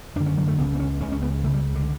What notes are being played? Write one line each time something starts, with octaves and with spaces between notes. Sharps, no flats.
F#2 D3 D4
C#4
F#3
A3
C#2 C#3 B3
B3
C#4
C#2 C#3 C#4
C#4
B3
C#2 C#3 A3
G3
D3